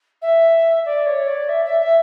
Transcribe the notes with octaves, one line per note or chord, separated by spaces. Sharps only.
E5
D5
C#5
D5
E5
E5
E5